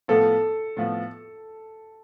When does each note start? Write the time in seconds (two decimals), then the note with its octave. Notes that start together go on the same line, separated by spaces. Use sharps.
0.08 A2 F3 B3 A4
0.77 A2 F3 B3